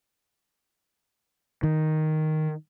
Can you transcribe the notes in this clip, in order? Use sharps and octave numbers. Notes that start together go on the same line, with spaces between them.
D#3